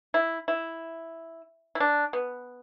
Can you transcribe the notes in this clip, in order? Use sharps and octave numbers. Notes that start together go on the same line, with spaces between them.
E4
E4
E4
D4
B3